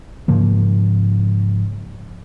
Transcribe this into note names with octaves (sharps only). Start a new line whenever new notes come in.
G#2 C#3 F3 A#3